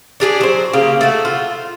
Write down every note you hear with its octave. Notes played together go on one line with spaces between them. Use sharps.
D4 G4 G#4 D5
F#3 C5
C#3 A#3 G4
A3 F#4
F4